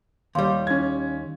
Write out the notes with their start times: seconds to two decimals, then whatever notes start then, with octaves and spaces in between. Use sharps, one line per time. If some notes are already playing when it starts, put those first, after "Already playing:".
0.35 D#2 G3 F5 C6
0.67 C#4 G#6